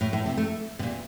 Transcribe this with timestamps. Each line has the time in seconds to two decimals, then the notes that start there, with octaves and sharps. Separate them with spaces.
0.01 A2
0.13 A2
0.26 C3
0.37 A3
0.79 C3
0.83 A#2